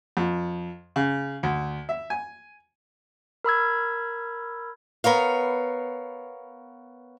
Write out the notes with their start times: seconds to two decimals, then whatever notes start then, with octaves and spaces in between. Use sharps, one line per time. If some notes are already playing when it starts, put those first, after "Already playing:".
0.17 F2
0.96 C#3
1.43 D2
1.89 E5
2.10 G#5
3.44 A#4 B5 E6 G#6
5.04 B3 A#4 C#5 F5